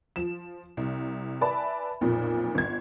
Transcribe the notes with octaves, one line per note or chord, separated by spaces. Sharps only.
F3 E7
C2
B4 D5 E5 G#5 A5 B5
B1 F2 A#2
G1 G#6